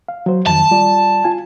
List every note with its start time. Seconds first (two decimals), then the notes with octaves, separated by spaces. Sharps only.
0.08 F5
0.26 F#3 C5
0.47 F2 D#3 A5
0.71 G3 F4 D5
1.24 F4 G#5